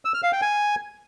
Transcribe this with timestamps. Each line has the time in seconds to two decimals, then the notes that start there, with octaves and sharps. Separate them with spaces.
0.05 E6
0.14 F6
0.23 F5
0.32 G5
0.41 G#5